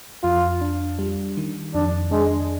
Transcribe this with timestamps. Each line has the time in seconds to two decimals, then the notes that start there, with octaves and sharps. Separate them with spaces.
0.23 F2 F4
0.61 D4
0.99 G3
1.37 D#3
1.74 F2 D4
2.11 G#3 D4